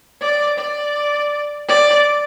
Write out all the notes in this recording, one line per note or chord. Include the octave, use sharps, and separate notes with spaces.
D5
D5
D5